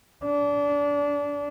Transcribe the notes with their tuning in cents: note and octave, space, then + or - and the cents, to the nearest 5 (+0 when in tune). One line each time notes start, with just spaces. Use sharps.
D4 -25